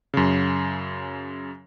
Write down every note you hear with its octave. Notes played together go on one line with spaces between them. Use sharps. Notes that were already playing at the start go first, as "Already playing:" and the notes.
F#2 C#3